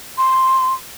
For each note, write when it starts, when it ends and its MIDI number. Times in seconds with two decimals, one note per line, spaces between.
0.18 0.74 84